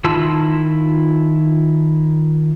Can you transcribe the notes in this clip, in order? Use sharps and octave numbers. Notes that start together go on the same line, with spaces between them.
D#3 E4 F4 A5 E6